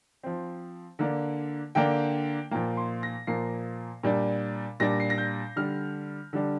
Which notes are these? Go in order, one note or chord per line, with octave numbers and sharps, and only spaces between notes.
F3 C4
D3 A#3 D4
D3 A#3 D4 G5
A#2 F3 A#3 G5
C6
A#6
A#2 F3 A#3 C7
A#2 G3 D4
A#2 G3 D4 A#6
C7
A#6
G6
D3 G3 D4 F6
D3 G3 D4